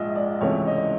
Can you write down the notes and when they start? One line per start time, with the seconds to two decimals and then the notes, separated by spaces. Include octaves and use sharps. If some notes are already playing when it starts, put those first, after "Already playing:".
Already playing: A#1 G#2 F3 G#3 D#5 E5
0.16 D5
0.41 C#2 C3 E3 A3 C#5
0.67 D#5